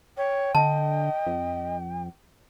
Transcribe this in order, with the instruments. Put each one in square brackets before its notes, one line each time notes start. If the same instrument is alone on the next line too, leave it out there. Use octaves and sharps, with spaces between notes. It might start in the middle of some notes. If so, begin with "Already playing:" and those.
[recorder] C#5 [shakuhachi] G5
[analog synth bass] D3 [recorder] D#5 [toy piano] A5
[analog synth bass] F2